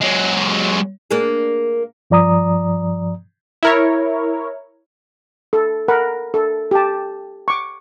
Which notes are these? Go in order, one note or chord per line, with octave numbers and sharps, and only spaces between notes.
F#3 G#3
A#3 D4 G#4
G2 F3 D5 A#5 D#6
E4 A#4 C#5
A4
A#4 F#5 B5
A4
G4 A5
C#6 D6